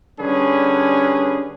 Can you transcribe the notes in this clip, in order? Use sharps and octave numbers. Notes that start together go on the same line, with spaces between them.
D3 G3 C#4 G#4 B4